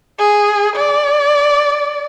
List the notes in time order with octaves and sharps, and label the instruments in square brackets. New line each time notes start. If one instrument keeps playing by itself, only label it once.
[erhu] G#4
D5